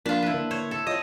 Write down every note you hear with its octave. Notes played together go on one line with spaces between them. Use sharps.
F3 A#3 D4 F4 B5
E4 B4
D3 A#3
C5 C#5
A4
C4 F4 C#5 D#5 A#6